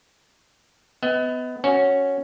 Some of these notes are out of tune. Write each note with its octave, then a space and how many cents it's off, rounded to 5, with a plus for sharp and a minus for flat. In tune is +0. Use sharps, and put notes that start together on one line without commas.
B3 +20 D#5 +35
C#4 +0 F#4 +0 C#5 +0